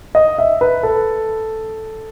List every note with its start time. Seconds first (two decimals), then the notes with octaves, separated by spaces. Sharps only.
0.15 D#5
0.38 E5
0.61 B4
0.83 A4